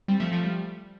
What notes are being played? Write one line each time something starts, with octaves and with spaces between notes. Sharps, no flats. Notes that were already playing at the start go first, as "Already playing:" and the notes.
G3 C4
F3 A3
F3 A3
G3